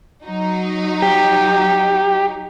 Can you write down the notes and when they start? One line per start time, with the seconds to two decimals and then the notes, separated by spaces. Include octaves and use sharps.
0.25 F#3 D#4
1.02 G4